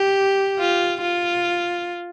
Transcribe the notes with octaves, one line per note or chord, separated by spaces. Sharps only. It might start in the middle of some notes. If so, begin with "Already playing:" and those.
Already playing: G4
F4
F4